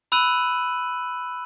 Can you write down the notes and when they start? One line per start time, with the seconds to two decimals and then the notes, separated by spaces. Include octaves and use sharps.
0.12 B5 E6 F#6 D#7 F#7